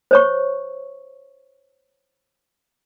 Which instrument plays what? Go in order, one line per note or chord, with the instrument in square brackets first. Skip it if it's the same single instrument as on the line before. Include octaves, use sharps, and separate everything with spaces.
[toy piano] C5 C#5 C#6